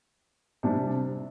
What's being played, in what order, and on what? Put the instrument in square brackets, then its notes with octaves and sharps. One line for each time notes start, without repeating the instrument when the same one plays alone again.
[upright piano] C3 G3 D4